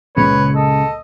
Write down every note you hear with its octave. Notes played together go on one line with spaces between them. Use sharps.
F#1 C#2 A#2 C#3 G#3 B4 C#5
A4 D#5